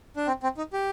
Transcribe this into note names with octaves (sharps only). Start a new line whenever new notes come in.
D4
C4
C4
D#4
G4